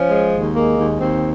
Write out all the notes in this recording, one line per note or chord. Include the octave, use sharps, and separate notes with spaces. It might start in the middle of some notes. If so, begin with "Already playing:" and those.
Already playing: F3 C#4
G#3
D#2
G#3 A#3
D#2
D#2 C4